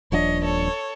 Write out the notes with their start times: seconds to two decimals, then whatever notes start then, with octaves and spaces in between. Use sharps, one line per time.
0.12 D#1 F3 D4 C#5 D#5
0.43 A4 C#5